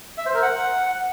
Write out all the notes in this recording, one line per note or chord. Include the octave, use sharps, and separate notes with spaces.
E5
C5
A#4
F#5